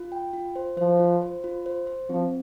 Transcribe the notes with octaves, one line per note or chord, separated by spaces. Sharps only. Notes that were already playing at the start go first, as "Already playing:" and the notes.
Already playing: F4
G5
F4
C5
F3 C5
F4
C5
F4
C5
C5
F3 C4